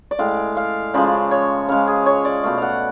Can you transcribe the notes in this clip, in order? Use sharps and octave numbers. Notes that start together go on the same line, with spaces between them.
D5
A2 G#3 F5
F5
C#3 F3 G#3 D5
C#5
C#3 G#3 F5
G#4
C#5
D5
B2 A3 F5
F5 F#5